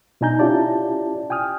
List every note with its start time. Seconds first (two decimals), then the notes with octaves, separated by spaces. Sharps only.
0.21 B2 D4 D#4 G#5 A#5 G6
0.39 C#4 E4 F4 G4 D5 A5
1.30 G5 G#5 D#6 F6